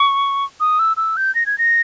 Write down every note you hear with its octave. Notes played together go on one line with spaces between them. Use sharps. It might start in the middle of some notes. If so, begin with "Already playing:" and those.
Already playing: C#6
D#6
E6
E6
G6
A#6
G#6
A#6